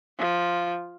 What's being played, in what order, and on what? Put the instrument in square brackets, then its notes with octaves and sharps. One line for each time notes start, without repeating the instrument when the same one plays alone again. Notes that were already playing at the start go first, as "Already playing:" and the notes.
[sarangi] F3